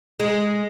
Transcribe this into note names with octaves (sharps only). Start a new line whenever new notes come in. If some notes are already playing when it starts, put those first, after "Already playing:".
G#3